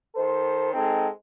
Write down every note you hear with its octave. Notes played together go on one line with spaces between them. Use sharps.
D#3 A4 C5
G#3 C4 D#4 A4